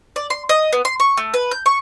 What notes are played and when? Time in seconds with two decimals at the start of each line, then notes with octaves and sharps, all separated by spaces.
0.16 D5
0.30 C6
0.49 D#5
0.73 B3
0.85 C6
1.00 C#6
1.17 A3
1.34 B4
1.51 G6
1.66 C#6